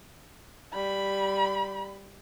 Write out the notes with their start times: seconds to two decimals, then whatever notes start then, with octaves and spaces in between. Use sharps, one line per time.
0.73 G3 B5